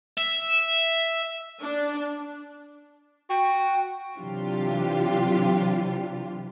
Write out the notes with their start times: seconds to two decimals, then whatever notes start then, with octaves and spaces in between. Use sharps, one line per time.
0.18 E5
1.61 D4
3.30 F#4 G5
4.17 C3 E3 F#3 D4 F4 G4